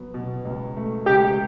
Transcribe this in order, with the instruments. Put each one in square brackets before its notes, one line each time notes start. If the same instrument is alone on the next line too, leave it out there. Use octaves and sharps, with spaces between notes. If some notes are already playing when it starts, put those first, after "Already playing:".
Already playing: [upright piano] F#3 B3
B2
C#2
A3
[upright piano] C#2 [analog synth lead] G4